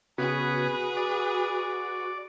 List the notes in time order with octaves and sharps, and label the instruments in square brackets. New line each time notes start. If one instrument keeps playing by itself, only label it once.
[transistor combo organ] C#3 B3 [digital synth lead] F#4 [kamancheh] G#4 B4
[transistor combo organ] D5